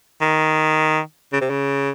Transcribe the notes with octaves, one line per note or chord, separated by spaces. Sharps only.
D#3
C#3
C3
C#3